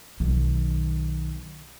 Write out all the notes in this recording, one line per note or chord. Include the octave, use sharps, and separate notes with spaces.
B1 D#3